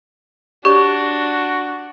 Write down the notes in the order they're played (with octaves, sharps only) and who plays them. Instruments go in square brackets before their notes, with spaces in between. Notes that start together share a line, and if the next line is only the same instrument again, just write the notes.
[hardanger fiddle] D4 [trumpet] F#4 [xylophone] G4 [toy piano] C#5 D5 C#6